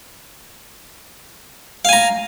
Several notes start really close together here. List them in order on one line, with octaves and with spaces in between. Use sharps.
F5 G#5 A#5